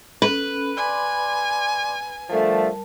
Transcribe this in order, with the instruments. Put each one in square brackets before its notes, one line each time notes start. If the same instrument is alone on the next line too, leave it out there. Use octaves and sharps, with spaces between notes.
[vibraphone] C#4 A4 [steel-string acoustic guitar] B4
[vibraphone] D5 C6 D6 [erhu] G#5
[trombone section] D3 F3 A3 [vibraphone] G3 A#4 A5